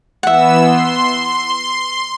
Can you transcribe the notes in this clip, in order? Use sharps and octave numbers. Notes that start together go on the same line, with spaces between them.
E3 B3 E5 F#5 E6
C6